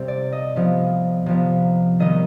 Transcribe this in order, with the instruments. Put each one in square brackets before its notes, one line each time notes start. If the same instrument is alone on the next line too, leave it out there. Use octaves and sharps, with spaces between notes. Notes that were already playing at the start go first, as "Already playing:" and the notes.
Already playing: [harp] C3 G3 C4
D5
D#5
C3 F3 B3
C3 F3 B3
D#3 G3 B3 D#5